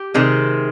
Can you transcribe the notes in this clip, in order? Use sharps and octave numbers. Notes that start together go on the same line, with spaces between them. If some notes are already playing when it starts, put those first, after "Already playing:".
Already playing: G4
C3 D#3 G#3